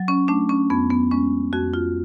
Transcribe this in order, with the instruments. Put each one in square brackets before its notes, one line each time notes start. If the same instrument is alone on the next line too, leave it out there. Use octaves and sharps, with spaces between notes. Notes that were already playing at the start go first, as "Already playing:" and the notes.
Already playing: [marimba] F#3
C#4
A3 D4
C#4
F2 B3
B3
G#3 C#4
F2 F#4
F4